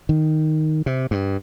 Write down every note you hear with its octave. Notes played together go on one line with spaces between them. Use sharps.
D#3
C3
G2